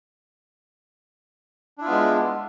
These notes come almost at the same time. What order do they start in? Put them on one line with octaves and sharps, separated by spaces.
D4 E4 F4 B3 G#3